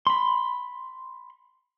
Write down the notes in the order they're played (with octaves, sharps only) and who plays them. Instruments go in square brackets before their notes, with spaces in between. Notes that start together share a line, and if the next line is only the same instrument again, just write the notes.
[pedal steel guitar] B5 C6